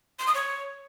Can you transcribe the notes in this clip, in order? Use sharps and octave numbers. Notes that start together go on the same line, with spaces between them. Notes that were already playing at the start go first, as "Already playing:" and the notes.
C6
D#6
C#5